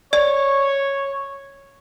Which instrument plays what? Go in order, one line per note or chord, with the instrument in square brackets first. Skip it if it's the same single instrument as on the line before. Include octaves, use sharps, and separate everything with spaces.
[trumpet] C#5 [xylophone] D5